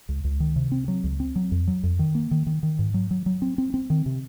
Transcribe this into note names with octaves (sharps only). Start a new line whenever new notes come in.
C#2
C#2
D#3
C3
C4
F#3
C#2
C4
F#3
F2
F#3
F2
D#3
A#3
D#3
D#3
D#3
G#2
F#3
F#3
F#3
C4
C4
C4
D#3
C3